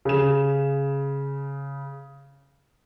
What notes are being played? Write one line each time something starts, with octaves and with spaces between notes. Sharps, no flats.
C#3 E7